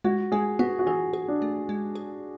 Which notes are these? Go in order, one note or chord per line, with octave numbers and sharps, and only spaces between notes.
G#3 F#4
G#3 G#4
B3 F#4
F#4
E3 G#4
G#4
D4
A3
G#3
G#4